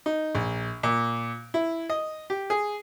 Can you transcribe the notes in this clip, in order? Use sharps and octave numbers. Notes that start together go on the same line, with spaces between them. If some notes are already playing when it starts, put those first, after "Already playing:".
D#4
A#1
A#2
E4
D#5
G4
G#4